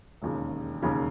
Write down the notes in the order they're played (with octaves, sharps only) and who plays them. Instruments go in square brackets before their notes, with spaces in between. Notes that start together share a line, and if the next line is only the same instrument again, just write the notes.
[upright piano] E1 D#2 C#3
E1 D#2 C#3